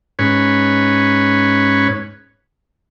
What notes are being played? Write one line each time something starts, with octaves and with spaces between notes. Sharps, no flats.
G#2 C#4 B4 C#5